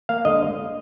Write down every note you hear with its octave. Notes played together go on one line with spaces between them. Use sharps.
A#3 F5
D3 D#5